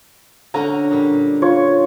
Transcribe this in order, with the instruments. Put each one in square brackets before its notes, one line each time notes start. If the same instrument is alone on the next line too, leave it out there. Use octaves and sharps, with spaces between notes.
[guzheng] D3 C#4 F#4 [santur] A#5
[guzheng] A#2 G3
[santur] F4 C#5